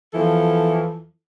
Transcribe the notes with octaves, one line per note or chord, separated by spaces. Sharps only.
E2 E3 F3 A4